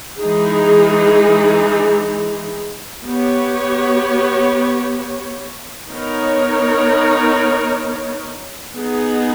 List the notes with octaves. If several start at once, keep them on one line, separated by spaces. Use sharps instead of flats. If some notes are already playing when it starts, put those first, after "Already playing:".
E3 G#3 D#4 G#4
B3 G4 C#5
B3 D#4 A#4 C#5
B3 D#4 G#4